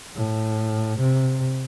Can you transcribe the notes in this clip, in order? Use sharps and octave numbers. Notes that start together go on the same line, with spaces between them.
A2
C3